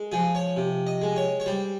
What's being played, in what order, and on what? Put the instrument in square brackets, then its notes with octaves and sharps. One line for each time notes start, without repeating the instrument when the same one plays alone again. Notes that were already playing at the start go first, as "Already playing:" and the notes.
Already playing: [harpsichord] G#3
F3 G#4
C#5
C3
D#5
G#3
C#5
C#5
G3 C5